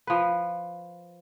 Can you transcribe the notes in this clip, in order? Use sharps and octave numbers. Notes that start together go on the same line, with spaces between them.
F3 B4